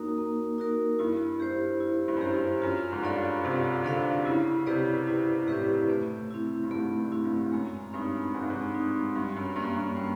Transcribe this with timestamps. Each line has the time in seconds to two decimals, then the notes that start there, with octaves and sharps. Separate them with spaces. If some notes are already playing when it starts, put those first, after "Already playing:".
Already playing: F#2 A#3 D#4 F#4 A#4
0.18 A#3
0.58 D#4 F#4 A#4
0.99 G2 E4
1.40 G2 G4 C5
1.80 E4
2.08 G2
2.17 F#2
2.21 G2 G4 C5
2.36 G2
2.62 F#2 F4
2.92 G#2
3.03 G2 A4 D5 F5
3.44 C3 F4
3.85 D3 A4 D5 F5
4.25 C#3 E4
4.66 C3 G4 B4 D5
5.07 E4
5.48 A2 G4 B4 D5
5.90 A3
6.30 C4 E4
6.63 G2
6.71 G#2 A3
6.97 G2
7.12 C4 E4
7.25 G2
7.52 F#2 G#3
7.93 G2 C4 D#4
8.34 G#2 G#3
8.42 G2
8.50 G#2
8.74 C4 D#4
9.15 G2 G3
9.36 F#2
9.56 G2 A#3 C#4
9.76 G2
9.97 G3